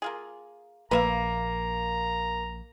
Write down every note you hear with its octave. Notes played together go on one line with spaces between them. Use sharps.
A#3 F4 G#4
A#1 A#3 B4 E5 F5 A#5